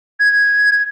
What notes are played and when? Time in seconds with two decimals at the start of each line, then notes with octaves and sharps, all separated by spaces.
0.20 G#6